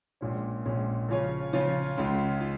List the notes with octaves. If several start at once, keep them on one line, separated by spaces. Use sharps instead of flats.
A#1 A#2 G#3 C#4
A#1 A#2 G#3 C#4
C#3 F3 C#4 F4 C#5
C#3 F3 C#4 F4 C#5
C#2 C#3 G#3 F4
F4